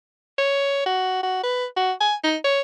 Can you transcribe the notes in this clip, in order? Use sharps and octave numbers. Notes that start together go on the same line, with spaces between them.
C#5
F#4
F#4
B4
F#4
G#5
D#4
C#5